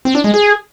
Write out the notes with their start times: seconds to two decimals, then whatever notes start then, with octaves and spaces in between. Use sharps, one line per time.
0.05 C4
0.15 D4
0.24 G#3
0.34 G#4